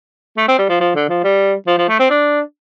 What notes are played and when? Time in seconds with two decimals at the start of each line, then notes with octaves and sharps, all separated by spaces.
0.37 A3
0.48 C4
0.59 G3
0.69 F3
0.81 F3
0.96 D3
1.09 F3
1.24 G3
1.67 F3
1.78 F3
1.89 A3
2.00 C4
2.10 D4